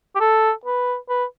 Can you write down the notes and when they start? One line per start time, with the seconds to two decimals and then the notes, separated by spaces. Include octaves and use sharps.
0.16 G4
0.20 A4
0.65 B4
1.09 B4